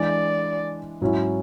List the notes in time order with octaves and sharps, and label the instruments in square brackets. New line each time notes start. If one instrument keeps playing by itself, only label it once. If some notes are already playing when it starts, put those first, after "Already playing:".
Already playing: [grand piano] E3 G#3 D4 [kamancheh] D5
[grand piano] G#2 F#3 C#4 E4